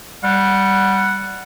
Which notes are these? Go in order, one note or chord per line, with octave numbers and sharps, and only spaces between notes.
G3 F#5